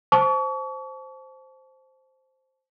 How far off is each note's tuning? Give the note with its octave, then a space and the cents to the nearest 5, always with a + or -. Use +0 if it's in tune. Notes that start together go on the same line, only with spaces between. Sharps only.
C5 +0 A5 -20 C#6 +40